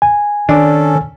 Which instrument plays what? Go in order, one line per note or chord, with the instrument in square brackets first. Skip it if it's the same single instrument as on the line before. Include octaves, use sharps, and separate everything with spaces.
[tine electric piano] G#5
[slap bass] D#3 [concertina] C#4 A4 [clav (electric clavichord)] D4